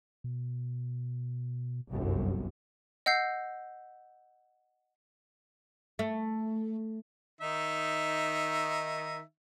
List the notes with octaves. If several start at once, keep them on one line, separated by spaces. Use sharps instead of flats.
B2
G1 C2 F#2
D#5 F#5 E6 G6 C7
A3
D#3 D#4 E5